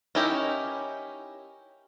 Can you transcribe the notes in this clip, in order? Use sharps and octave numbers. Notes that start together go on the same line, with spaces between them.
C#4 D#4 E4 G4 A#4